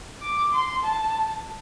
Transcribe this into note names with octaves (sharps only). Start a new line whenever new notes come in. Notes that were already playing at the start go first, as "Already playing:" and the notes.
D6
C6
A5